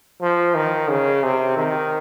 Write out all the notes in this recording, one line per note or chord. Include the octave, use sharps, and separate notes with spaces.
F3
D#3
C#3
C3
D#3